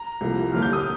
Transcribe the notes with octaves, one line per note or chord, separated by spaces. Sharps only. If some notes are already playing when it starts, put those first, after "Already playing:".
Already playing: A#5
C2 C3 F3 A#3
D#2 D3 G3 A#3 F6
G6
D#6